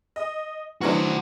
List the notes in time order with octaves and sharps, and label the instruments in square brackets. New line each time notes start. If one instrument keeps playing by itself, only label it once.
[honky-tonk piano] D#5
[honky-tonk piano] E3 F#3 D4 [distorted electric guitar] F#4 C5